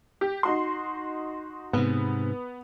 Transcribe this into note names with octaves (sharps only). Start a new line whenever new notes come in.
G4
D#4 F#4 C6
G#2 C3 B3